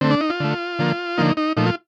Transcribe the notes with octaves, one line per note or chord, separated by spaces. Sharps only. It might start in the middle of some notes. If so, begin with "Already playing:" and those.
D3 A3 C4
D4
D#4
F4
D3 A3
D3 F3 A#3
D3 F3 A#3 D#4
D#4
A#2 F3 A3 D#4
F4